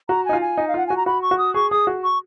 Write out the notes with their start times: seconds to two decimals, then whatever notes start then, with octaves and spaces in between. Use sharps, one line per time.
0.09 F#4 A#5
0.25 D#4 G#5
0.33 F4
0.41 G#5
0.58 D#4
0.68 F5
0.74 F4 F#5
0.87 F#4 G#5
0.97 A#5
1.06 F#4 B5
1.22 C#6
1.31 F#4
1.38 D#6
1.54 G#4 C#6
1.71 G#4 D#6
1.87 F#4
2.04 C#6